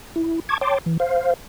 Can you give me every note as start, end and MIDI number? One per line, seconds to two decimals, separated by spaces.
0.16 0.40 64
0.49 0.58 81
0.49 0.58 85
0.49 0.58 86
0.49 0.58 92
0.61 0.78 73
0.61 0.78 79
0.61 0.78 81
0.61 0.78 84
0.61 0.78 86
0.86 0.97 52
1.00 1.34 72
1.00 1.34 77